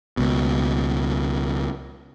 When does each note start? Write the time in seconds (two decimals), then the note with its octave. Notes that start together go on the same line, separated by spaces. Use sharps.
0.17 C#2 B2